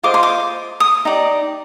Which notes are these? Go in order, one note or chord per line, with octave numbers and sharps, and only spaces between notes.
F4 C5 D#5 D6
C6
D6
D#6
D#4 G4 D5